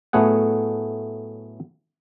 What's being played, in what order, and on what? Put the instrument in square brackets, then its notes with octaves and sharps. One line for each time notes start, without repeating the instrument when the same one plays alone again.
[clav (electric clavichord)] A2 F#3 A3 B3 G#4 F#5